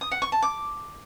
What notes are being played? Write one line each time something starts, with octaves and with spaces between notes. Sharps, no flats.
D#6
F#5
C#6
A5
D6